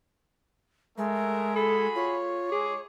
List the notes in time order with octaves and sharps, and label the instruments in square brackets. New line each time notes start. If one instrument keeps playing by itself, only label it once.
[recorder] G#3 [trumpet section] A3 A#4 E5
[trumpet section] F#4 G#4 B5 [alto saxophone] A4
[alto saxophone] F4 [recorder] C#5
[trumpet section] G#3 D6 [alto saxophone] G#4